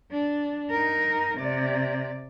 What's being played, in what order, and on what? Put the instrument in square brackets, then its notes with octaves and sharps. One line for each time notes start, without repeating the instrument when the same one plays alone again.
[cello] D4
D#4 A#4
C3 D5